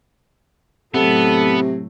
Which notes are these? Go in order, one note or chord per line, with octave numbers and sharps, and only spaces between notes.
A2 C3 F#3 B3 A4